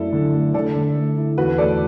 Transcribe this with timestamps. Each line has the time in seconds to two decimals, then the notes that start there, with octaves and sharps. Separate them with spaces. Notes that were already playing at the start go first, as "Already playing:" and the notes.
Already playing: F#2 A3 E4 A4 D5
0.12 D3
0.33 A3
0.54 D3 A4 D5
0.75 D3
0.96 A3
1.17 E4
1.38 E2 F#4 B4
1.58 A3 A4 D5